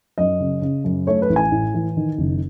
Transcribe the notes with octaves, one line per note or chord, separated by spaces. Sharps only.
F#2 D#5
C#3
C#3
F#2
A3 C#5
B4
A1
G#5
A2
E3
D#3
F#1